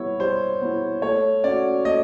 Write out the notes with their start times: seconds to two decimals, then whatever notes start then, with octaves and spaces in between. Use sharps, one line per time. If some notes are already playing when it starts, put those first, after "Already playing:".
Already playing: G3 B3 E4 C#5
0.20 G3 C5
0.61 B3 E4
1.02 A3 C#5
1.44 C#4 F#4 D5
1.85 A3 D#5